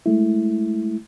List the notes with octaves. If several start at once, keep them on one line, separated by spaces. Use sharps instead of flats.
G#3 A3 E4